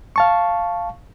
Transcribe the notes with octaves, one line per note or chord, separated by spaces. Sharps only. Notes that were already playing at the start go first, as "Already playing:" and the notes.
F5 A5 C#6